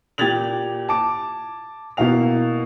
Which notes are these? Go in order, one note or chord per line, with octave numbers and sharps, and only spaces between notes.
A#2 G4 G#6 A6 F7 F#7
A5 D6 D7
B2 A#3 E4 F5 F7